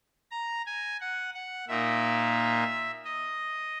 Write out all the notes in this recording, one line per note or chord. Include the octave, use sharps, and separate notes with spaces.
A#5
G#5
F#5
F#5
A#2 A#3 D#4 E5
D#5